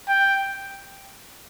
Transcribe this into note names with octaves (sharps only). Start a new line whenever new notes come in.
G5